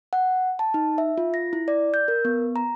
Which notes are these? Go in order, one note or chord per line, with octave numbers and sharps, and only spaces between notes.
F#5
A5
D#4
E5
F4
A#6
E4
D5
G6
A#4
B3
A#5